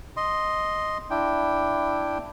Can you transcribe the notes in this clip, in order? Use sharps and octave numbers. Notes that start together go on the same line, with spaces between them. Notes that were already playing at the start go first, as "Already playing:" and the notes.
D#5 C6
D4 E4 G5